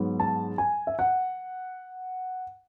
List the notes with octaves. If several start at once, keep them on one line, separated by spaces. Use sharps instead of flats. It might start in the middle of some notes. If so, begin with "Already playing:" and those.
Already playing: G#2 F#3 B3
A5
G#5
E5
F#5